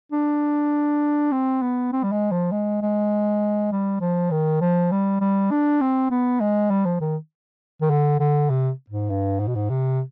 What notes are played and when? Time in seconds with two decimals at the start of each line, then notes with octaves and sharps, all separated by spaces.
0.12 D4
1.32 C4
1.62 B3
1.93 C4
2.04 G3
2.12 G#3
2.32 F3
2.52 G#3
2.82 G#3
3.72 G3
4.01 F3
4.31 D#3
4.61 F3
4.92 G3
5.21 G3
5.51 D4
5.81 C4
6.11 B3
6.41 G#3
6.71 G3
6.85 F3
7.01 D#3
7.82 D#3
7.90 D3
8.20 D3
8.50 C3
8.90 G#2
9.10 G2
9.40 G#2
9.48 B2
9.55 G#2
9.70 C3